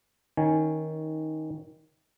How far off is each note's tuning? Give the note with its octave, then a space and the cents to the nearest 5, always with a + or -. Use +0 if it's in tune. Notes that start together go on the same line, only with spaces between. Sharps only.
D#3 +15 C#4 -5 G#5 +0